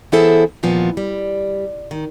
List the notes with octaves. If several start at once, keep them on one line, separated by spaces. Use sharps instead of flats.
E3 B3 E4 G#4 A4 C5
D#2 A#2 E3 F3 B3
G3
D#3